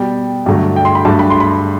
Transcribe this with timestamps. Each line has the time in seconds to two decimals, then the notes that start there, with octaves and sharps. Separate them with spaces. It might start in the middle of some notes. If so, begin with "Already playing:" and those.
Already playing: B2 G3 G5
0.46 G2 D3 F#3 A3
0.76 G5
0.85 C6
0.95 B5
1.05 G2 F#3 A3 A5
1.19 B5
1.30 C6
1.40 B5